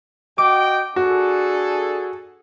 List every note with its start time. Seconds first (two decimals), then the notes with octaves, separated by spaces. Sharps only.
0.38 F#4 D#5 G5 D6
0.96 D4 F#4 G#4 A4